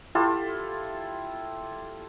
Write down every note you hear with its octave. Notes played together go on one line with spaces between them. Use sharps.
E4 F4 G4 A4